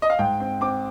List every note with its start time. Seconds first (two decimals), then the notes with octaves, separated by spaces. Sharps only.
0.02 D#5
0.10 F5
0.19 G#2 G5
0.40 C4
0.61 C4 D6